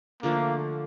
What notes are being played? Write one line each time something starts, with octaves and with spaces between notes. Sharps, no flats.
D3 F3 A3 A#3 D4